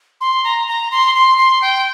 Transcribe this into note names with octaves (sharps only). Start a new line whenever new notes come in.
C6
A#5
A#5
C6
C6
C6
G5